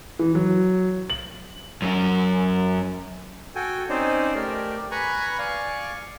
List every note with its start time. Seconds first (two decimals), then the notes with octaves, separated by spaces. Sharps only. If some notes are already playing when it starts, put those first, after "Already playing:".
0.19 E3
0.35 F#3
1.10 F#7
1.82 F#2 F#3
3.55 F#4 A4 G5 G#5
3.89 C4 C#4 D#4 C5 D5
4.35 A3 G4 A#4 D5
4.91 B4 G#5 A#5 B5 C#6
5.39 D5 F5 G#5 C#6